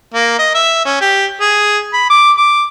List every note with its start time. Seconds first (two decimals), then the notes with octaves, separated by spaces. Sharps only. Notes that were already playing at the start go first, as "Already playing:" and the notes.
0.14 A#3
0.39 D#5
0.55 E5
0.85 C#4
1.01 G4
1.41 G#4
1.93 B5
2.10 D6
2.37 D6